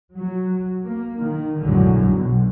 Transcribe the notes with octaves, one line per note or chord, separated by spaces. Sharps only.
F#3
A#3
D#3
B1 F#2 A2 D3 F#3 G#3
B1 B2